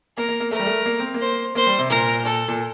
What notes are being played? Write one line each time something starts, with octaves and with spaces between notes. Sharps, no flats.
A#3 A#4
A#3
A#3
A3 A#4
G3
A3
A#3
C4
A#3
C5
A#3 C5
G3
C3
A#2 A#4
A4
A#2